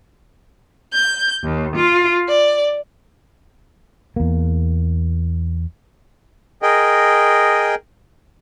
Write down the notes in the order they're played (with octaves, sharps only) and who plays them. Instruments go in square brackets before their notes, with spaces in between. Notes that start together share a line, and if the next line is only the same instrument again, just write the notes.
[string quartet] G6
D#2
F4
D5
[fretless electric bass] E2 A#3
[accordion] G#4 A#4 D#5 G5